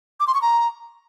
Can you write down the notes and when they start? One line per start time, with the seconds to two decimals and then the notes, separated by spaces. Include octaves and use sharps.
0.20 D6
0.27 C6
0.35 C#6
0.42 A#5